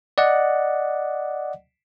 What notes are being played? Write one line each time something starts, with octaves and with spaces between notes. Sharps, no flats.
D5 D#5 F#5